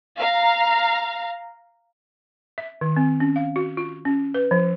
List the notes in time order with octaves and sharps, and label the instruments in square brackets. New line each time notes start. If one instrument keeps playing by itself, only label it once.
[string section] F5 A#5
[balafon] E5
D#3
C4
C#4
F5
F#4
F4
C#4
B4
F3